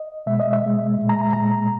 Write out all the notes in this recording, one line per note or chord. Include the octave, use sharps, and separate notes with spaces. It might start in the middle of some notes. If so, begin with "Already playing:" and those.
Already playing: D#5
B2 G#3 E5
D#5
E5
B2 G#3
A#2 G#3
A#5
A#5
A#2 G#3 A#5